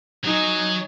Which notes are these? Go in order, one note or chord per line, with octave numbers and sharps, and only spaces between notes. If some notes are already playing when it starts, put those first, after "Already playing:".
F#3 D#4 G#5